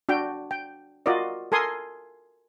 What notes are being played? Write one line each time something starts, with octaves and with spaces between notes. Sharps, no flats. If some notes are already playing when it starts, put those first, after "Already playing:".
D4 F#4 G5
G5
F4 F#4 A#4 D5 D#5
A4 A#4 G#5 C6 D#6